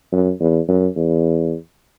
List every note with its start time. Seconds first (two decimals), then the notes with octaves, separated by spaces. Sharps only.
0.12 F#2
0.40 E2
0.68 F#2
0.96 E2